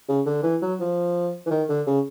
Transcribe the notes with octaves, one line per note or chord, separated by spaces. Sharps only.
C#3
D3
E3
F#3
F3
E3
D#3
D3
C#3